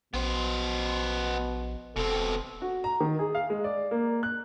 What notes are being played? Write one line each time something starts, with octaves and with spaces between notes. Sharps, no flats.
A#1 B2 B3 C5
E1 B2 C4 A4
F#4
A#5
D#3
G#4
F5
G#3
D5
A#3
F#6